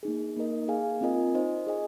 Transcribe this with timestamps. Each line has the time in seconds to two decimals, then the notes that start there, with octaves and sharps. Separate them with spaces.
0.03 A#3 D#4 G#4
0.36 A#3 D#4 A#4 D#5
0.68 G#4 F5 G#5
1.01 C4 F4 A#4 D#5 G#5
1.34 D#4 C5 D#5
1.67 G#4 D#5 G#5